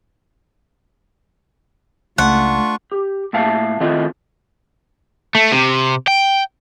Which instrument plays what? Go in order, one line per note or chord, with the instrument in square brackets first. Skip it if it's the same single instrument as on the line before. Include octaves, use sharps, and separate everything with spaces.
[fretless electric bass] C#2 [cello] A3 [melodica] D4 F4 C#6 [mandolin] F#5
[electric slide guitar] G4
A2 A#3 E5 F5 A5
D#3 A3 C4 E4 F4 D#5
[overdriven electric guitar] A3
C3
G5